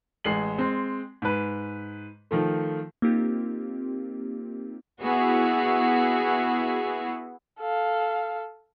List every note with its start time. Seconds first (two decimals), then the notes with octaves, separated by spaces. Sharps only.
0.24 A1 G#3 C7 F#7
0.58 G#3 C4
1.22 G#2 B4
2.31 D#3 F3 A3
3.02 A#3 C4 D#4 F4 G4
5.00 B3 E4 F#4 G#4
7.60 A4 F5